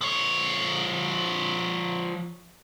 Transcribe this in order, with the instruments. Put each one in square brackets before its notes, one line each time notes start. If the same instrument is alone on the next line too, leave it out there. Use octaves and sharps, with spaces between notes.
[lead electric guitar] F3 C#5